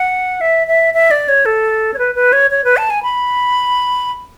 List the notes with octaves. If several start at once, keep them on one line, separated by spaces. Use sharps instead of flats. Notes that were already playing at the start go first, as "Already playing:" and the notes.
Already playing: F#5
E5
E5
E5
D5
C#5
A4
C#5
B4
B4
C#5
C#5
B4
A5
G#5
B5